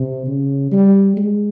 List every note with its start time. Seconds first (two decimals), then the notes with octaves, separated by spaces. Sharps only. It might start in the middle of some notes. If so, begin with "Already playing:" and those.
Already playing: C3
0.27 C#3
0.72 G3
1.17 G#3